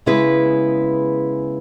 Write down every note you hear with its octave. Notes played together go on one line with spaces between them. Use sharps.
C#3 G#3 B3 E4 B4